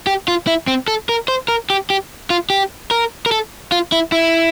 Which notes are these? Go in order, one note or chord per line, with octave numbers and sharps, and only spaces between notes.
G4
F4
E4
C4
A4
A#4
C5
A#4
G4
G4
F4
G4
A#4
A#4
A4
F4
E4
E4